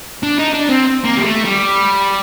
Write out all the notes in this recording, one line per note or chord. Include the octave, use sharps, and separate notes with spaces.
D4
D#4
D4
C4
A#3
G3
A3
G3